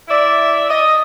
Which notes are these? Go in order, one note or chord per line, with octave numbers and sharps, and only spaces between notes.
E4 D5 E5
D#5